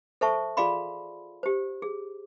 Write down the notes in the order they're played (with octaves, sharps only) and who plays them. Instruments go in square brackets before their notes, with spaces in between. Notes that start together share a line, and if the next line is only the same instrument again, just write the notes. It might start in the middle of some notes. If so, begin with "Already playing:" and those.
[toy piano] A4 C5 E5 A5 C#6
F4 G#4 D5 F5 B5 C6
G4 C5
G#4